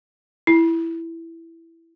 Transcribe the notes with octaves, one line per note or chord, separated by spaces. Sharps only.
E4